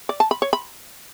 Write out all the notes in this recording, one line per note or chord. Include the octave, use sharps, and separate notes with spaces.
D5
A5
B5
C#5
B5